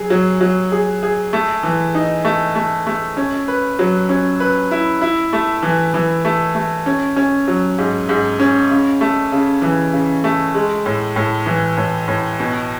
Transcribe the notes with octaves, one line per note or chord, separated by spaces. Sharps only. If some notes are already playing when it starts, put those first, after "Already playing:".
Already playing: F#3 G#4
F#3
F#3
G#4
G#4
A3
E3
D#4
A3
A3
A3
C#4
B4
F#3
C#4
B4
E4
E4
A3
E3
E3
A3
A3
C#4
C#4
F#3
G#2
G#2
C#4
C#3
A3
C#3
E3
C#3
A3
G#3
A2
A2
E3
A2
A2
B2